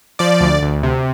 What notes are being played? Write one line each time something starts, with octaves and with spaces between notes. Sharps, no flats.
F3 D5
D2
D2
C3